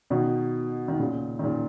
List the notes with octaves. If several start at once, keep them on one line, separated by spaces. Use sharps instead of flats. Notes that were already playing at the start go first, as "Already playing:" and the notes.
B2 D#3
D#3
A#2 C#3
D#3
A#2 C#3